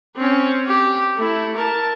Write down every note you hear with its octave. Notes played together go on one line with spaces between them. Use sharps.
C4 C#4
G4
A3 E4
A#4 A5